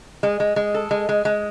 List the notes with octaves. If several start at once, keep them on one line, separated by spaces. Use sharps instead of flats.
G#3
G#3
G#3
A4
G#3
G#3
G#3